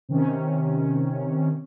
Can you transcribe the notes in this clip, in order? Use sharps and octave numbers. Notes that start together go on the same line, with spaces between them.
C3 D#3 C#4